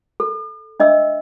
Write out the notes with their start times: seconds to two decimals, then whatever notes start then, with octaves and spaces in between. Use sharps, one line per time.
0.20 A4
0.80 D4 D#5 E5 E6